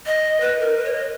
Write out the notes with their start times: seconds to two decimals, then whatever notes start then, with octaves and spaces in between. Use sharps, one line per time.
0.06 D#5
0.41 B4
0.59 A#4
0.77 B4
0.85 C#5
0.93 D#5